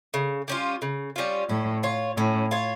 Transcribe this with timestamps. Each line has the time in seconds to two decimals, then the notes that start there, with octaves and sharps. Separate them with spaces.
0.14 C#3
0.48 G3 C#4 F4
0.82 C#3
1.16 G3 C#4 F4
1.49 A2 C#4
1.83 F4 C#5
2.17 A2 C#4
2.51 F4 C#5